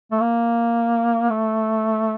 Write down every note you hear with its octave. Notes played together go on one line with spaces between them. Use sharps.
A3
A#3
A3